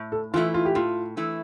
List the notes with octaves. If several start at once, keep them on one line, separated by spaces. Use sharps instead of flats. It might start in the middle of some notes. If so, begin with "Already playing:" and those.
Already playing: A2
A4
E3 A3 E4 F4
F4
G4
A2 F4
E3 A3 E4